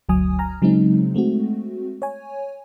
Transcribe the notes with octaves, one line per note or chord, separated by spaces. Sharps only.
G1 D2 F#3 G#5 D#6
G#5 A#5 F6
C#3 F#3 G#3 C4 D#4
G#3 A3 C4 F#4
C#5 G#5